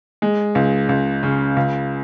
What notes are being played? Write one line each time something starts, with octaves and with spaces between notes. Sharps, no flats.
G#3
C#2
C#2
C#3
C#2